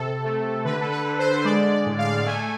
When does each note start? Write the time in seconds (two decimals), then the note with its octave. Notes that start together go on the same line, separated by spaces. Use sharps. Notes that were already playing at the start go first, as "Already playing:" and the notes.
Already playing: C3 A4
0.24 A3
0.65 D3 B4
0.81 A4
0.92 B4
1.05 D3
1.19 C5
1.45 G#3 D5
1.71 D5
1.86 A2
1.98 F5
2.26 A3 G#5